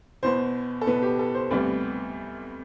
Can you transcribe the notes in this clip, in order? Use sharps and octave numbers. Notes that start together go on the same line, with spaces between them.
E2 B2 B3 C5
A4
E2 B2 B3 B4
G4
A4
C5
D2 C3 G3 B3 D5